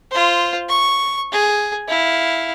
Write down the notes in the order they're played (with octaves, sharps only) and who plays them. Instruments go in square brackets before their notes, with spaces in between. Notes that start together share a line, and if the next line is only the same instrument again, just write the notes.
[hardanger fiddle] F4 C5
C#6
G#4
E4 F5